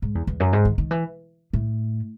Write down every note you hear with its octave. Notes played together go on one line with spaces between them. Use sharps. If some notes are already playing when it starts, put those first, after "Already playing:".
G#2
E2
E2
F#2
G#2
D#3
D#3
E3
A2